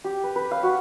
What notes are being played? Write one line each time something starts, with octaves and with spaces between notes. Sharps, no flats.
G4
B4
B4
F5
F#4